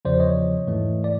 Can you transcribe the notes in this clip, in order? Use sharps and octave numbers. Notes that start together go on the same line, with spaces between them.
E2 C#3 F3 C5 D5
C#5 D#5
G#2 E3 A3
D5